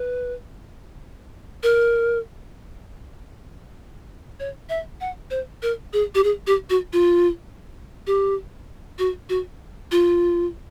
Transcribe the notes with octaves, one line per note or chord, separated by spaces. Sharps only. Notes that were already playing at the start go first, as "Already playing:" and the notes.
Already playing: B4
A#4
C#5
E5
F#5
C5
A#4
G#4
G4
G#4
G4
F#4
F4
G4
F#4
F#4
F4